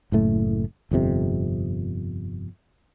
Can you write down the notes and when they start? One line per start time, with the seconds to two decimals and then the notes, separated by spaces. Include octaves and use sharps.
0.12 F#1 A2 A3
0.91 G1 F2 C3